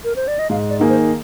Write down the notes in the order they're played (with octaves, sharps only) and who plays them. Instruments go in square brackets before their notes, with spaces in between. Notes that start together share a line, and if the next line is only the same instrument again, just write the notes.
[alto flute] A#4
C5
D5
D#5
[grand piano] G#2 [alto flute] F5
[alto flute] D5
[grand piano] D#3 A#3 D#4 G#4
[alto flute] C5